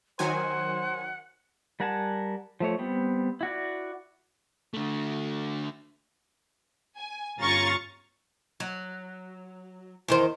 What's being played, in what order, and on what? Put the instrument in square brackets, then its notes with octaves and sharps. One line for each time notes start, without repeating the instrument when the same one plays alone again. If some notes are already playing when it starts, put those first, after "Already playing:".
[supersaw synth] D#3 F#3 G#5 [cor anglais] C5 [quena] F#5
[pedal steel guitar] G3 A#4 F#5 G#5 A5
F3 A3 C#5
G3 B3 C4
E4 F#4 D5
[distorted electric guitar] D3 A3
[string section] G#5
G1 C#4 F4 A#5 C#6 A6
[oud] F#3
E2 D#3 C5